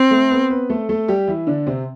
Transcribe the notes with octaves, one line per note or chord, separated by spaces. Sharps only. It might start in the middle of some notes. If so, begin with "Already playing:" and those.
Already playing: C4
A3 A4
B3 B4
B3 B4
A3 A4
A3 A4
G3 G4
E3 E4
D3 D4
C3 C4